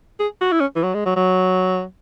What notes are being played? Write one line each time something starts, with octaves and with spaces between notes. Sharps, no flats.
G#4
F#4
E4
C#4
E3
F#3
G#3
F#3
F#3